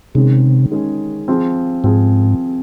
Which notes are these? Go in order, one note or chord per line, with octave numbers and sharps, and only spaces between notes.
C3 D#3 G#3 C#4 G#4
D#3 G#3 C#4 G#4
F3 C4 F4 G#4
G#2 F3 C4 F4 G#4